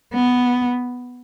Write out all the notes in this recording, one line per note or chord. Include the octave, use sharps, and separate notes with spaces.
B3